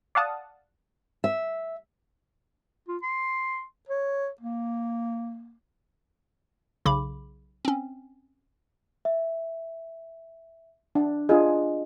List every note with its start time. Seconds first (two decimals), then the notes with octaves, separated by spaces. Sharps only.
0.15 D5 F5 F#5 A5 D#6
1.24 E5
2.88 F4
3.03 C6
3.89 C#5
4.41 A#3
6.85 B1 C#3 B5 D6
7.65 C4 C#4
9.05 E5
10.95 D4
11.29 D4 F4 G#4 D#5